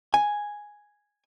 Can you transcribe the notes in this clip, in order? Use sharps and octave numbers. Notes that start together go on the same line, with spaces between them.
G#5